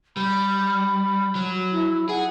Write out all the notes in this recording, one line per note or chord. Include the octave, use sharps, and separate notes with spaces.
G3 B5
F#3
E4
G#4 F#5